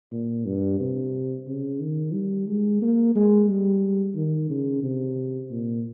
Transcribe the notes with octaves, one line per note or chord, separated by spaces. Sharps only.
A#2
G2
C3
C#3
D#3
G3
G#3
A#3
G#3
G3
D#3
C#3
C3
A#2